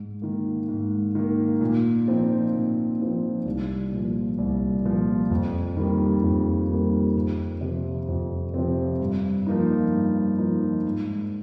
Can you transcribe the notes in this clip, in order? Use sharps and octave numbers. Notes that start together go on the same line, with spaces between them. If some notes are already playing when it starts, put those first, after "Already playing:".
Already playing: G#2
D#3 A#3
G#2
D#3 A#3
A#2
F3 C4 D#4
A#2
F3 C4 D#4
C2
A#2 F3
C2
A#2 F3
F2
D#3 G3 A#3
F2
D#3 G3 A#3
F2
C3 F3 C4
F2
C3 F3 C4
G2
F3 A#3 D#4
G2
F3 A#3 D#4
G#2